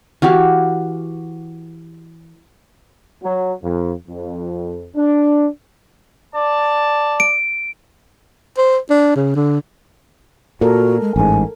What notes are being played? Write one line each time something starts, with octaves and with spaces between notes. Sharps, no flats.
E3 F#4 G4 F5
F#3
F2
F2
D4
D5 A5
D7
C5
D4
C#3
D3
A#2 F#4 A4 A#4
G#3
A1 G#2 G#5